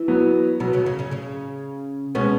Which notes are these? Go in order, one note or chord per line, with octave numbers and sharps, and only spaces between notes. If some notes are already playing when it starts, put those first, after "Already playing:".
Already playing: E3 E4
F#3 B3
B2 F#3 B3
C#3 C#4
C#3 C#4
C#3 C#4
C#3 C#4
B2 G#3 B3 C#4